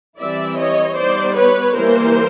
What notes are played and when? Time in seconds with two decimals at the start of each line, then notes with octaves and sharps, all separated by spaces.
0.19 E3 G3 C4 E4 D5 E5
0.57 C#5 D#5
0.96 G3 B3 D#4 C5 D5
1.36 B4 C#5
1.74 E3 G3 A#3 A#4 C5